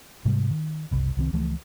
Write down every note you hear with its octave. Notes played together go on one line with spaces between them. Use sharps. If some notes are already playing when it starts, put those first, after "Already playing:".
G#2 C3 G3 G#3
D#3
F#1 C2
C2 D#3 C4
C#2 E3 F3 A3